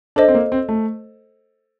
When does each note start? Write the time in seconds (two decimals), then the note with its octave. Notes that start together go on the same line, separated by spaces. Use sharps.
0.16 D4 A4 C5 D#5
0.28 C4
0.35 A#3
0.52 C4
0.69 A3